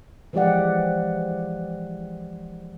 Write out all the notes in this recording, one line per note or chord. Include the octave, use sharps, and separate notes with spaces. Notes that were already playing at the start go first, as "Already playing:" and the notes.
E3 F3 G#3 G4 D5 F#5